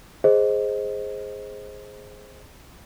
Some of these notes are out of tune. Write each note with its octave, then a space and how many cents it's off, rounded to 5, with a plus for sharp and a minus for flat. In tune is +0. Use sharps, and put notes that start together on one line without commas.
G#4 +0 C5 +5 D#5 +0